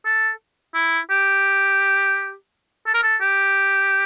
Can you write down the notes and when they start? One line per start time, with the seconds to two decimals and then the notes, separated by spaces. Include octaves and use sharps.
0.05 A4
0.75 E4
1.10 G4
2.86 A4
2.94 A#4
3.03 A4
3.21 G4